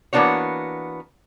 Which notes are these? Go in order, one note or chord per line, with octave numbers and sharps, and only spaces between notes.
E3 A#3 B3 D4 F#4 C#5